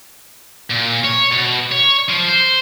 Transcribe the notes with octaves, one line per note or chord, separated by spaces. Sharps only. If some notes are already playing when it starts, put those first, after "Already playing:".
A#2
C#5
B2
C#5
F3
C5